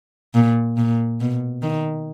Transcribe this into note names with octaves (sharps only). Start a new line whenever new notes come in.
A#2
A#2
B2
D#3